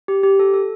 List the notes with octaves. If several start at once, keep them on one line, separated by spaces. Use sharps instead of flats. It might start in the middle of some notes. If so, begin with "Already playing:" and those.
G4
G4
A4
A4